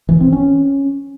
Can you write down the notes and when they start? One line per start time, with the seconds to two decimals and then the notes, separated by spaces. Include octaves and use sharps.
0.09 E3
0.20 C4
0.32 C#4